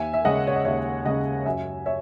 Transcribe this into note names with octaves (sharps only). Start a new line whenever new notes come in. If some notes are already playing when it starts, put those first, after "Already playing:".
Already playing: D#2 E5 G#5
E5
C#3 G#3 C#4 D#5 F#5
C#5
D#5
D#2 C#5 E5
C#3 G#3 C#4 D#5 F#5
F#2 E5 G#5
C#5 E5